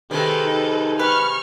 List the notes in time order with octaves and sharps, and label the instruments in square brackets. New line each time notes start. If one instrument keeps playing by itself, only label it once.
[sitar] C3 D#3 G#3 [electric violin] A4 B4
[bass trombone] D#4
[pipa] B4 [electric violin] C#6 F6